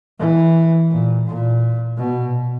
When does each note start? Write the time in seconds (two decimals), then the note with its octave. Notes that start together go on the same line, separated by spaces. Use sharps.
0.19 E3
0.91 A#2
1.27 A#2
1.97 B2